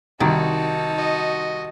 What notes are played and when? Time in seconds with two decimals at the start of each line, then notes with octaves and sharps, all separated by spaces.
0.20 C2 D#3 D#4 F#4 A5
0.96 F#4 D#5